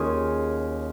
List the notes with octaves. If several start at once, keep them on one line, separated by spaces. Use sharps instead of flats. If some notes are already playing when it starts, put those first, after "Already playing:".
Already playing: D#2 D#3 C#4 F4 G#4